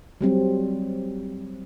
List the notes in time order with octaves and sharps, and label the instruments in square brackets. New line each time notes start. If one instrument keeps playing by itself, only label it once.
[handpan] F#3 G3 C4